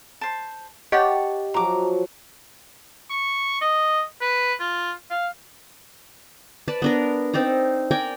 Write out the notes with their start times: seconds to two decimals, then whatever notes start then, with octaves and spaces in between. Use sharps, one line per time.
0.21 C5 A5
0.92 G4 C#5 D#5 F#5 A5
1.54 F3 F#3 A#5 D6
3.10 C#6
3.61 D#5
4.21 B4
4.59 F4
5.10 F5
6.68 B4 D5 A5
6.82 B3 D4 A#4
7.33 C4 D#4 D5 A#5
7.91 A#4 D5 G5 G#5